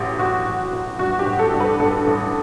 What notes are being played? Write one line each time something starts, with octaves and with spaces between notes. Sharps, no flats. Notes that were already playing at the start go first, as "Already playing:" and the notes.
Already playing: A1 F#3 G4
A1 F#4
A1
A1
G2 F#4
G4
A1
A4
G2
B4
G2 A4
A1